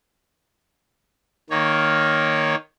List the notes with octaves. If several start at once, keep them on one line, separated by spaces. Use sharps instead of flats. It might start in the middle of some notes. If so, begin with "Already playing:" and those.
D#3 A#3 C#5